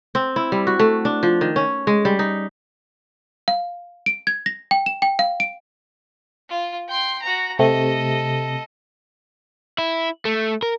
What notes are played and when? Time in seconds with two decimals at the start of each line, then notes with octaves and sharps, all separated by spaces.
0.15 C4
0.36 E4
0.52 G3
0.67 F#4
0.79 A3
1.05 D4
1.23 F3
1.41 D#3
1.56 C#4
1.87 G#3
2.05 G3
2.19 D#4
3.48 F5
4.06 D7
4.27 G#6
4.46 A#6
4.71 G5
4.86 E7
5.02 G5
5.19 F5
5.40 D7
6.49 F4
6.88 G5 C6
7.22 F#4 A#5
7.59 C3 A3 A4 D#5
9.78 E4
10.25 A3
10.63 A#4